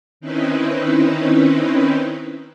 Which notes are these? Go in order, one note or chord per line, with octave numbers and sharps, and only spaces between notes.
D#3 C4 C#4 D#4 E4 B4